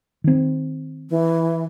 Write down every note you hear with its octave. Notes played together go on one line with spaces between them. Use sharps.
D#3 C4
E3